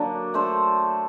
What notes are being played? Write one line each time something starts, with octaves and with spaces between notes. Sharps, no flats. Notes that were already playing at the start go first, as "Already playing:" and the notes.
Already playing: D3 F#3 A#3 D4
A3 D4 A4 C5